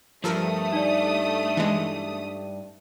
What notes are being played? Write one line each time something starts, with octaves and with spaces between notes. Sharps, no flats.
G2 F3 A3 A4 A#4 D#6
D#4 D5
E3 G#3